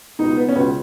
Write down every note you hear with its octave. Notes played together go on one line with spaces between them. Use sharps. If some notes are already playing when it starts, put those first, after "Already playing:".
C#2 B2 D#4
B3
C#4
C#2 B2 B3